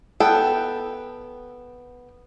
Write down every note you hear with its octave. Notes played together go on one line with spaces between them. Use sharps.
B3 A4 G5